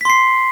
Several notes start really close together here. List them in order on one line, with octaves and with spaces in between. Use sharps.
B6 C6 C7